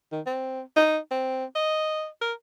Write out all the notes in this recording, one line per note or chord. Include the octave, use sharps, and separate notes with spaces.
D#3
C4
D#4
C4
D#5
A#4